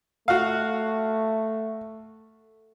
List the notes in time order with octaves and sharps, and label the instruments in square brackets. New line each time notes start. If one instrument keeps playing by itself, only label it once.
[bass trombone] A3 [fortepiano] F#4 F5